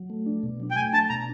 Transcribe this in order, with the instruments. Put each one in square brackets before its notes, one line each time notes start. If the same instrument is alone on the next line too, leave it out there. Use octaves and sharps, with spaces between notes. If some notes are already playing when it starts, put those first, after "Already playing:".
Already playing: [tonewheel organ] F#3
A3
D4
B2
F#3
[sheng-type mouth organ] G5
[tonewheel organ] A3 [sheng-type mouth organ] G#5
[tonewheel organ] D4 [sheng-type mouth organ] A5
[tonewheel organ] B2 [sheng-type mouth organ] A#5